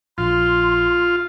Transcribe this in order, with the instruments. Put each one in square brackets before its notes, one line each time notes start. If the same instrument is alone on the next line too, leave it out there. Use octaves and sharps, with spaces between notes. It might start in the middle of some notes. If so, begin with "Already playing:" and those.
[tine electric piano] A#1 [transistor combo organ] F4 [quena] C6